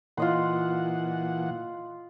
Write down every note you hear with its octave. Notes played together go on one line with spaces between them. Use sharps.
A#2 E3 F4 D#5 F#5 C6